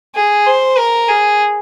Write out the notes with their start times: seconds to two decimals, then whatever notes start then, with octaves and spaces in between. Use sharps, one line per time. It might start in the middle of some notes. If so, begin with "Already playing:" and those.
0.15 G#4
0.46 C5
0.77 A#4
1.08 G#4